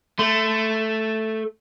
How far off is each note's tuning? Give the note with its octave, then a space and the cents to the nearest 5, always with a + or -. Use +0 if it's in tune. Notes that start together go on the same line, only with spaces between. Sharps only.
A3 +0 C6 -35